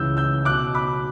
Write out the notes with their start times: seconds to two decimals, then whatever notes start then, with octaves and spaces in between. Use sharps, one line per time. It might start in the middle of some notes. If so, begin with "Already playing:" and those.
Already playing: C#2 C#3 E3 E6 G6
0.17 E6 G6
0.45 B1 B2 D6 F#6
0.75 B5 D6